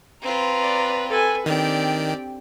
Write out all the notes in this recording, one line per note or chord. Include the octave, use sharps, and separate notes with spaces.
C4 F4 B4 A#5
D5
A4 B4 G#5
D#3 C4 D4 G4 D5 G5